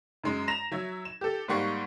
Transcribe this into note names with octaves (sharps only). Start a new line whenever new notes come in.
F#2 G#3
A#5 A#6 E7 F7
F#3 E5 G#6
E7
G4 A4
G#2 G3 A#3 F#5 C#6 C7